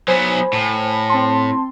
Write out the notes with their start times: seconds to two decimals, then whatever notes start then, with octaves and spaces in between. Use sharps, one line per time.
0.08 F#3 B3 C5 G#5 B5
0.53 A2
1.09 C4 A5 C6